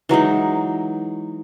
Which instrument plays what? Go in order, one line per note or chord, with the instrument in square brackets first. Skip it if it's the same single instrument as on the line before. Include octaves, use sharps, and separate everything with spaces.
[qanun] E3 F#3 G#3 D#4